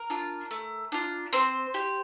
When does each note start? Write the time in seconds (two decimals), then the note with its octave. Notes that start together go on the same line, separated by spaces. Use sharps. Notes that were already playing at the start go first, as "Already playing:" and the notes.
Already playing: A#4
0.10 D4 F4
0.51 A3
0.92 D4 F4
1.33 C4 C5
1.74 G4